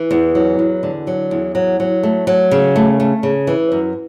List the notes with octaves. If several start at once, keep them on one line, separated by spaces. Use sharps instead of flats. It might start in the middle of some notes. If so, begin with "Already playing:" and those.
Already playing: E3
E2
F#3
E2
D3
F#3
E2
F#3
F#3
A3
F#3
C#3
A3
A3
C#3
E3
F#2